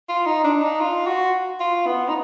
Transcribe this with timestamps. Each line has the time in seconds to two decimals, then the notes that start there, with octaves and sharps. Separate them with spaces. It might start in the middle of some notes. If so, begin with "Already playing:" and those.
0.09 F4
0.26 D#4
0.44 D4
0.62 D#4
0.80 F4
1.07 F#4
1.60 F4
1.86 B3
2.08 D#4